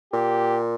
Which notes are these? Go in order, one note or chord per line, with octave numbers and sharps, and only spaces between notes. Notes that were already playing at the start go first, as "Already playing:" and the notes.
A#2 G4